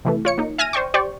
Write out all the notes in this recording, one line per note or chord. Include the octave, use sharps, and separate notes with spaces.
C3 E3 A3
F4 C#5 C#7
A#3 D#4
E5 G#5 F6 G#6 A#6 D#7
C5 D5 G5 C#6
G4 C5 D5 G5 C#6